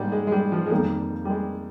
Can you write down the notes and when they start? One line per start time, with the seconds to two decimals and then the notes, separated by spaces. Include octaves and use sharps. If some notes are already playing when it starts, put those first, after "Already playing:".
Already playing: G#2 G3 G#3 A#3
0.12 G#3
0.27 G#3
0.32 G3
0.52 F3
0.66 G#3
0.71 F2 D#3 G3 A#3
1.25 G3
1.30 G#3